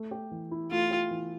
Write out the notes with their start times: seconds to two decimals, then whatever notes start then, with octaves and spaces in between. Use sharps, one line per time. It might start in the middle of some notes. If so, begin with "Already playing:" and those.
Already playing: A3
0.11 G4
0.31 E3
0.51 E4
0.71 A3 F4
0.91 G4
1.11 E3